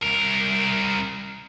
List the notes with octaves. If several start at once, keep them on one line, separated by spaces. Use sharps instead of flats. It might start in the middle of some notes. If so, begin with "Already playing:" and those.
C2 A#4